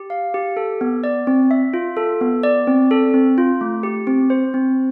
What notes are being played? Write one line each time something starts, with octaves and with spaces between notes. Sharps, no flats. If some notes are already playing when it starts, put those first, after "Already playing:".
Already playing: G4
F5
G4
A4
B3
D5
C4
E5
F4
A4
B3
D5
C4
A4
C4
F4
A3
G4
C4
C5
C4